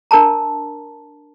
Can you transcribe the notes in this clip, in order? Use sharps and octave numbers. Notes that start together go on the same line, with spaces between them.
D4 A#4 A5 A#5